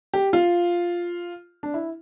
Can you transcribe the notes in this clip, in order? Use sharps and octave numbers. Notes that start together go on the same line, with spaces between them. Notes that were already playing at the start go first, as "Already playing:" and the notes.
G4
F4
D4
E4